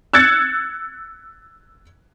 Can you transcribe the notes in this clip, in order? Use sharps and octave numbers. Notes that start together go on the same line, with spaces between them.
E6 F#6 G#6 A6 C#7